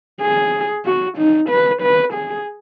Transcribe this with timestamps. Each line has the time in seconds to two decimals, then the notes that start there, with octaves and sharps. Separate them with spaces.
0.21 G#4
0.85 F#4
1.17 D#4
1.49 B4
1.82 B4
2.13 G#4